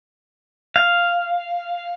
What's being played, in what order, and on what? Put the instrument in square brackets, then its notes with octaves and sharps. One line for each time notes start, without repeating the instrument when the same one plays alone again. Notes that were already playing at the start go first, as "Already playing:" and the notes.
[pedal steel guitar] F5